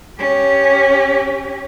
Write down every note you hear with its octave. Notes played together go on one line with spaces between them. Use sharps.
C#4 G4